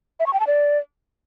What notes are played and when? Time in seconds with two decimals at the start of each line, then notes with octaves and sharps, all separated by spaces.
0.20 E5
0.26 C#6
0.33 G5
0.40 A5
0.47 D5